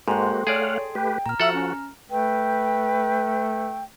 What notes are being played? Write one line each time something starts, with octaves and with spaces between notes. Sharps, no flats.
G#2 G#3 A#3 F#4 A4 C5 G5 C6
A3 G#4 C#5 D5 F5 F#5
A3 G4 B4 G5
A#2 A#5 F6
F3 F#4 A4 E5 F#5
C#4
A3 B4 G5